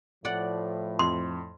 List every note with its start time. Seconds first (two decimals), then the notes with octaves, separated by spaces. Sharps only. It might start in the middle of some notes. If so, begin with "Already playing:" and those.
0.25 A2 F3 D5 F#5
0.99 F2 C6